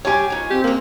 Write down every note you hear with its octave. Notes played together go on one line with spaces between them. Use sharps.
G3 D4 G4 C#5 G#5
A#2 D#4
C4 G4
G#3 A#3 C#4